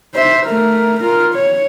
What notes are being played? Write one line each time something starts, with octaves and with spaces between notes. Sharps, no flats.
C5 E5
A3 A#4
F4 A#4
C#5